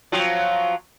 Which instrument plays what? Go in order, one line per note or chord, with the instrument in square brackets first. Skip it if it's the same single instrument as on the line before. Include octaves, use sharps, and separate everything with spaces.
[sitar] F3 F#3 C4